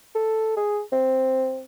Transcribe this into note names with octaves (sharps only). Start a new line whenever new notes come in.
A4
G#4
C4